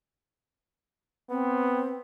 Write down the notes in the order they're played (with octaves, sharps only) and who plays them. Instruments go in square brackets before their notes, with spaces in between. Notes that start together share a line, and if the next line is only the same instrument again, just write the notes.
[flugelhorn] B3 [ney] C4